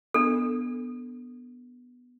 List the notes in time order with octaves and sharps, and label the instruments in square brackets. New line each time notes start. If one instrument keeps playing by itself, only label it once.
[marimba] B3 [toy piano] D4 A4